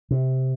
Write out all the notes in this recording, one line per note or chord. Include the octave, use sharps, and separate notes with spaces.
C3